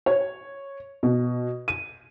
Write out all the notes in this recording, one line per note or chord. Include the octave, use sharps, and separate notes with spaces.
C#5
B2
D#7